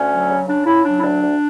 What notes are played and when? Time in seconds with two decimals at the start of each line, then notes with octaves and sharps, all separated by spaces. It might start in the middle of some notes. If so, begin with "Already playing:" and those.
Already playing: D2 C#4
0.11 F#3
0.30 C#3
0.48 C#3 D4
0.66 C#3 E4
0.84 F#3 D4
0.98 E4
1.03 D2 D4
1.21 D2